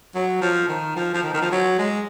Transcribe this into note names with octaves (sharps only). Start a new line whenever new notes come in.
F#3
F3
D#3
F3
F3
D#3
D#3
F3
F#3
G#3